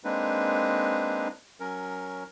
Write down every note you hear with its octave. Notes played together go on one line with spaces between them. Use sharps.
G#3 A#3 C4 D4 D#4 B4
F#3 C#4 A#4